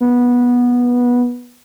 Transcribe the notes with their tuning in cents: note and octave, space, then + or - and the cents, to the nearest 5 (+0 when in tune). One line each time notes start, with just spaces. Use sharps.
B3 -15